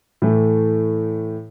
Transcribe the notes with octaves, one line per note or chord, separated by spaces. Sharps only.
A2 E3 A3